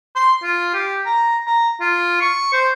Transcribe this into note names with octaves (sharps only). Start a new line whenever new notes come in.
C6
F4
G4
A#5
A#5
F4
C#6
C5